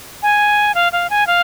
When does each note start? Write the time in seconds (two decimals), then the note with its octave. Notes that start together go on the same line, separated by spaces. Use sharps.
0.23 G#5
0.75 F5
0.92 F5
1.10 G#5
1.27 F5